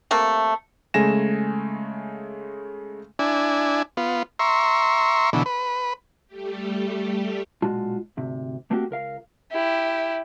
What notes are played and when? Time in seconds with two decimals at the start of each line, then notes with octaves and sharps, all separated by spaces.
0.11 C3 A3 A#3
0.94 C#3 G#3 A3 G#5 A#6 E7
3.19 D4 E4 G#5
3.97 B3 F4
4.39 E5 A#5 C6 C#6
5.33 B2 D3 E3
5.46 B4
6.27 G3 A3 G4
7.62 B1 A#2 G#3 F4 F#4 A5
8.17 D2 G#2 C3
8.71 A3 A#3 C4 E4 F#4 G4
8.90 C#2 A#4 F5
9.52 E4 G4